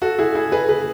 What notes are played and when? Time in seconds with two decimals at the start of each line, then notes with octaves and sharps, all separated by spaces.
0.02 F#4 A4
0.19 E4 G#4
0.35 E4 G#4
0.52 G#4 B4
0.69 G#4 B4